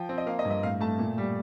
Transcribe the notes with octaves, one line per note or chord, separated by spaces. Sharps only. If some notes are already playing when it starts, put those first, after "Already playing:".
Already playing: F3 G5
C4
D#5
A#3 F5
D#5
G2
D#5
A2 F5
A3 A5
A#2
G3